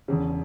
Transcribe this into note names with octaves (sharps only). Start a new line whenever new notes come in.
E1 E2 C#3